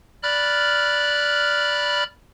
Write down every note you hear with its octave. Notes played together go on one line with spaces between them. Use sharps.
D5 B5 F6 F#6